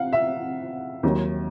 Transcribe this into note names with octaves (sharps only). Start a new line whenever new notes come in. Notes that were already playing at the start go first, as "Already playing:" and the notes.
Already playing: F5 F#5
E5
D#2 D#3 F#3